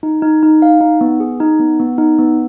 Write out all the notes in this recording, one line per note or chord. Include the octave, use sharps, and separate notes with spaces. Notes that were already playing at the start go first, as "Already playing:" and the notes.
D#4
D#4
D#4
F5
D#4
B3
G#4
D#4
B3
B3
D#4
B3